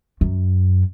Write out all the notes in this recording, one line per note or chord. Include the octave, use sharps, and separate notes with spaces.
F#2